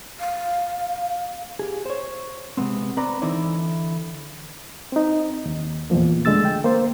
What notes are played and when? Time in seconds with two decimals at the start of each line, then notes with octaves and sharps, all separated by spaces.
0.20 F5
1.59 G4 G#4
1.86 C5 C#5
2.57 C3 G#3 B3 C4
2.97 C4 B4 D5 A#5
3.22 D3 E3 D#4 E4 C5 D5
4.92 C4 D#4
5.46 D#2
5.90 E2 A#2 E3 F3 A#3
6.25 D3 G#3 A3 E6 A6
6.45 G5
6.64 A#3 C5